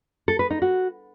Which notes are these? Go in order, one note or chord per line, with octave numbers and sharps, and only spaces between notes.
A4
B4
D#4
F#4